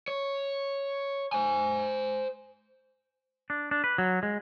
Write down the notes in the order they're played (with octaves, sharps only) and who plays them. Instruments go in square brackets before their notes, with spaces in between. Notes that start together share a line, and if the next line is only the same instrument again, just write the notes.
[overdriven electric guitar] C#5
C5 G#5
[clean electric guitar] D4
D4
B4
F#3
G#3